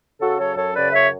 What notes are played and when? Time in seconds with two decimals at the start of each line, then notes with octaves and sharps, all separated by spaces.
0.20 C#3 F#4 A4
0.39 F#3 A4 C#5
0.57 F#2 A4 C#5
0.75 C#3 B4 D5
0.93 F#2 C#5 E5